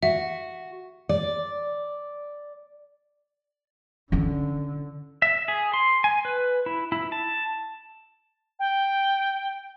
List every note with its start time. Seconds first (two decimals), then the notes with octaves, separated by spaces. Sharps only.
0.03 F#4 E5
1.09 D5
4.12 D3 C#4 E4
5.22 E5
5.48 G#4
5.74 C6
6.04 G#5
6.25 B4
6.66 E4
6.92 E4
7.12 A5
8.59 G5